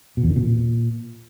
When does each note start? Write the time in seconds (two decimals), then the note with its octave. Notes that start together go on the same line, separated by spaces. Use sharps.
0.17 B2
0.23 E2
0.30 D3
0.36 B2
0.42 A#2